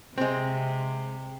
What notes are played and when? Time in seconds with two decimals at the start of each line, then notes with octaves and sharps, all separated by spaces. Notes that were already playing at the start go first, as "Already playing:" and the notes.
0.18 C3 G#3 C4